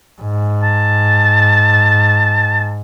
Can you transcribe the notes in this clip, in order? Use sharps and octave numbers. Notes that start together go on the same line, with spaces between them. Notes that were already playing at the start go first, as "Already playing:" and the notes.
G#2
A5